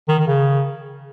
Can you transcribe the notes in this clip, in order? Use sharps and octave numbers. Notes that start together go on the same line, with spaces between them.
D#3
D#3
C#3